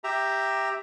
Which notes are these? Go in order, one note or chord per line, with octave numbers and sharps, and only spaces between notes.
G4 E5 A#5